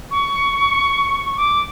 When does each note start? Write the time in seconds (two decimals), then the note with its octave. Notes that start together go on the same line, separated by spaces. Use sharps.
0.11 C#6
1.37 D6